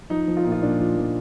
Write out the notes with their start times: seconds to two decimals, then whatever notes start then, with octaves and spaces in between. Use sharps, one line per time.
0.10 F3 D#4
0.27 F3
0.37 F4
0.44 A#2 D#4
0.52 F4
0.62 A#2 D4
0.80 F3
0.97 F3